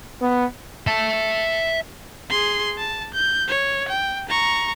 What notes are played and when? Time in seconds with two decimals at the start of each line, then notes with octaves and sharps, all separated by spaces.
0.22 B3
0.87 E5 A5
2.30 G#4 C6
2.78 A5
3.14 G6
3.48 C#5
3.89 G5
4.29 A#5 C#6